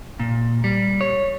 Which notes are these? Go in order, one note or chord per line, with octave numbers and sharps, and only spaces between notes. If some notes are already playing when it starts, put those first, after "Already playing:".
A#2
G3
C#5